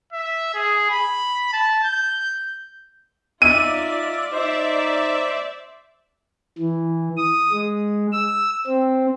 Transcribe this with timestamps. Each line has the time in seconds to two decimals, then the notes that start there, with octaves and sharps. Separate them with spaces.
0.13 E5
0.54 G#4
0.90 B5
1.53 A5
1.84 G6
3.42 D#4 F4 D5 E5 D#7
4.32 D#4 C5 D5 E5
6.58 E3
7.17 D#6
7.52 G#3
8.12 E6
8.67 C4